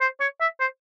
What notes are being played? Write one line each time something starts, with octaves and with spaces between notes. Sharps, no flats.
C5
C#5
E5
C5